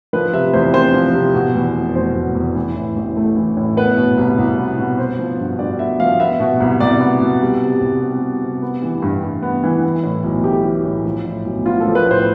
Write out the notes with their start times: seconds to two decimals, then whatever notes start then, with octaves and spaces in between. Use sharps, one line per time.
0.13 F3 B4
0.33 C3 E5
0.53 E2 C5
0.74 C4 C5
0.93 F3
1.14 C3
1.34 B2
1.55 E2
1.75 F1
1.95 F1 C5
2.15 B2
2.35 E2
2.55 E3
2.76 A2
2.96 A1
3.17 A3
3.36 E3
3.57 A2
3.77 B3 B4
3.97 B2
4.18 C2
4.38 C2
4.58 B3
4.78 B2
4.98 B3 C5
5.19 F3
5.39 G2
5.59 G2 D5
5.79 B3 E5
6.00 F3 F5
6.20 B3 E5
6.40 B2
6.60 C2
6.80 C2 D5
7.00 B3
7.21 B2
7.41 G3
7.62 C3
7.81 C2
8.02 C4
8.22 G3
8.43 C3
8.62 B3
8.82 E3
9.02 G2
9.23 G2
9.42 B3
9.63 E3
9.83 E3
10.03 A2
10.24 B1
10.44 A3 G4
10.64 E3
10.85 A2
11.05 F3
11.25 A2
11.45 B1
11.66 B3 F4
11.80 F3 A4
11.95 B4
12.06 A2 C5